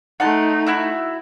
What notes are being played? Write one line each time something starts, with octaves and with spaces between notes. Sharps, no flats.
A3 D#4 F#5 A5 C6
E4 F#4 E5